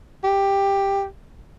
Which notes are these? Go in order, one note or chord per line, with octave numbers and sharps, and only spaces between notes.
G4